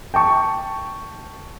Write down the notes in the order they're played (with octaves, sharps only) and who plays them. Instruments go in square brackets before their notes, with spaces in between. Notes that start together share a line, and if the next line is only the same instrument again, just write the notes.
[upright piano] G5 A5 C#6